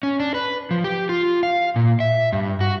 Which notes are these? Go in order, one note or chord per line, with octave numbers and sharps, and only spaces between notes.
C#4
D4
B4
F3
G4
F4
F5
A#2
E5
G2
F#4